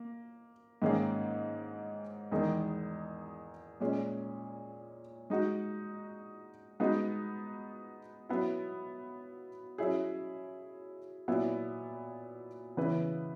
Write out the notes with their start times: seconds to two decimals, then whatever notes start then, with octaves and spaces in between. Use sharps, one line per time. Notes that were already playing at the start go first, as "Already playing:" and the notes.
Already playing: A#3
0.82 G#2 D#3 A#3 C#4 G#4
2.31 E2 D#3 G#3 D#4 A#4
3.80 A#2 G#3 C#4 G#4
5.30 G#3 D#4 F#4
6.80 G#3 B3 D#4 F#4
8.29 F#3 B3 E4
9.78 F#3 C#4 E4 G#4
11.28 A#2 F#3 B3 E4
12.77 C#3 E3 B3 E4 B4